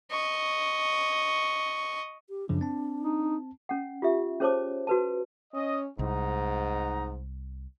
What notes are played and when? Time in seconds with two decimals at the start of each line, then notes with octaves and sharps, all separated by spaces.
0.11 D#5 C#6
2.29 G4
2.49 F#2 C#3 F3 D4
2.61 C4 A5
3.04 D#4
3.69 C#4 F#5
4.02 F4 G4 E5
4.40 C#4 G#4 C5 C#5 A5 D6
4.87 F#4 B4 A5
5.54 C#4 D#5
5.99 C2 G#2 D#4 F#5 A#5